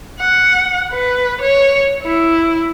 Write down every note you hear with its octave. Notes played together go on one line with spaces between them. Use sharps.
F#5
B4
C#5
E4